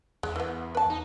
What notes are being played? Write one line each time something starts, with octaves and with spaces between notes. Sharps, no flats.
E2 G#3
E3 B3
B4 A5
D#4